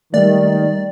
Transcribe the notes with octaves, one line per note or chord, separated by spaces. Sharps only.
D#3 G3 A3 D5